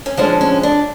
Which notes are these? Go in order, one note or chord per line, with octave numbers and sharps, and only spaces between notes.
C#4
D3 F3 G#3 C#4 D4
C#4
D4